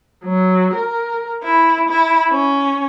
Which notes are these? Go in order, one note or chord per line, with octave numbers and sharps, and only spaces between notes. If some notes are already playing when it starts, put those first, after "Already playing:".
F#3
A#4
E4
E4
C#4